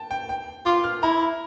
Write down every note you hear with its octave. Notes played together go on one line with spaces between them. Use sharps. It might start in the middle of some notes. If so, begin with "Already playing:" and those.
Already playing: G5 A5
G5
G5
F4 D6
F6
E4 A#5